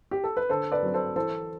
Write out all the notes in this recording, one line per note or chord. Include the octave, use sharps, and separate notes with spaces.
G4
A4
B4
D3 A4 C5
B4 D5
F#3 C4
A4 C5
E3 A4 C5